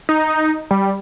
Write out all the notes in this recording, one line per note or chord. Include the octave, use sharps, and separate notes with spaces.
D#4
G3